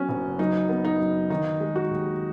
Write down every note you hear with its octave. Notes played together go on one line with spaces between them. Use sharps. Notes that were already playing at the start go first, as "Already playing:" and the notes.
Already playing: F#3 B3 C#4 F#4
F#1
F#3 D#4
B3
D#4
F#2
D#3 D#4
G#3
F#4
D#2